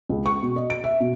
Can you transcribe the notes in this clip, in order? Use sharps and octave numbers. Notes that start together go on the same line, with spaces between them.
C#2
C#6
B2
D#5
D7
E5
B2